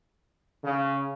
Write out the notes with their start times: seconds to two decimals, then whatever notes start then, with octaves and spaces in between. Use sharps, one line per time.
0.64 C#3